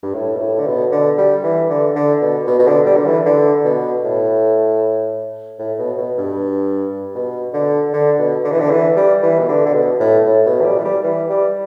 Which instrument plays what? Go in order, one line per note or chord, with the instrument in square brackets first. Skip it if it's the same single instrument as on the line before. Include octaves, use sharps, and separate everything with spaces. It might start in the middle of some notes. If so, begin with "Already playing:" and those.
[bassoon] G2
A2
B2
A2
D3
B2
D3
G3
E3
D3
D3
B2
B2
B2
D3
G3
D3
E3
D3
B2
A2
A2
B2
B2
G2
B2
D3
D3
B2
D3
E3
D3
E3
G3
E3
B2
D3
D3
B2
A2
A2
B2
E3
G3
E3
G3
E3
G3